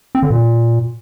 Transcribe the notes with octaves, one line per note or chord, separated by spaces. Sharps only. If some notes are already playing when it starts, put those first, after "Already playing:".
C4
D3
A#2